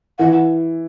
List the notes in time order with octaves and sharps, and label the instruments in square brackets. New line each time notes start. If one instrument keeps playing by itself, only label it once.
[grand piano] E3 [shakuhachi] F#5